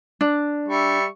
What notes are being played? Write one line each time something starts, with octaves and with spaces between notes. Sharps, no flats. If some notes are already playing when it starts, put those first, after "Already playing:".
D4
G3 E5 C#6